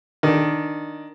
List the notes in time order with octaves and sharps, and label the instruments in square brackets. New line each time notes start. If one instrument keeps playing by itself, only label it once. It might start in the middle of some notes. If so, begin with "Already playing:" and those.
[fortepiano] D#3 D4